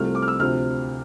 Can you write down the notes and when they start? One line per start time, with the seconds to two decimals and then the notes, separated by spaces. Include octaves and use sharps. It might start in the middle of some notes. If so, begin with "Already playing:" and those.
Already playing: C2 C3 F3 A3 C4 F6
0.15 D6
0.22 F6
0.28 E6
0.39 D2 C3 F3 C4 F6